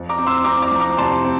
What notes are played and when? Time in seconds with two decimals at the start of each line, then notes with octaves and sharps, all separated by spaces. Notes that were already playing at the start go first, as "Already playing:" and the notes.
Already playing: F2
0.09 A#5 D6
0.18 C4
0.27 C6 E6
0.44 C4 A#5 D6
0.62 A#5 D6
0.71 F2
0.80 A#5 D6
0.98 C3 A5 C6
1.25 C4